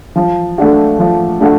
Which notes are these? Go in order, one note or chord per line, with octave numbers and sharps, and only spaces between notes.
F3
A3 D4 F#4
F3
A3 D4 F#4